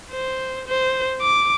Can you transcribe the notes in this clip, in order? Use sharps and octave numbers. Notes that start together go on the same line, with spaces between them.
C5
C5
D6